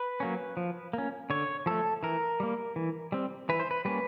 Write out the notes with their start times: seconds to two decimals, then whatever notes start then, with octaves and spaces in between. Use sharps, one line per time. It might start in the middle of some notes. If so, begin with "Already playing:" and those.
Already playing: B4
0.20 F#3 A#3 C#4
0.57 F3
0.93 A#3 C#4
1.30 D3 C#5
1.66 F3 A3 A4
2.03 E3 A#4
2.40 G3 A#3
2.76 E3
3.12 G3 C4
3.49 E3 B4
3.60 C5
3.71 B4
3.85 G3 A#3 C#4 B4